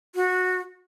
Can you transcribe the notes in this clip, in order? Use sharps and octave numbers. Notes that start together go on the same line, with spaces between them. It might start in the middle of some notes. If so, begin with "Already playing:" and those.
F#4